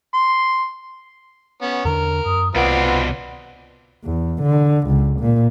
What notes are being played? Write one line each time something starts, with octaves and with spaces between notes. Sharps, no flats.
C6
B3 C#4
E2 D3 D4 A#4
F#2 D#6
C2 B2 C4 F4 B4 D5 F#5
E2
D3
C#2
A#2